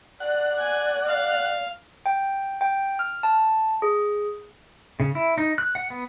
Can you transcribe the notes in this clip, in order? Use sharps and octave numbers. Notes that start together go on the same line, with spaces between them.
D5 F#5
G#5
F5
G5
G5
F6
A5
G#4
C#3
E4
D#4
F#6
F#5
B3